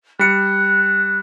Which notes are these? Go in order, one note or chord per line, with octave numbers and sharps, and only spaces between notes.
G3 F#6 C#7